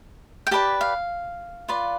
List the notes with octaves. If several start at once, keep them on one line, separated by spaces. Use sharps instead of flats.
G5
G4 B4 D5 A5
F5
F4 B4 D5